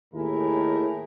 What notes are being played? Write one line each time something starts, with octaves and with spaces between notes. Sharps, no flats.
D#2 A2 D#4 E4 G#4 A#4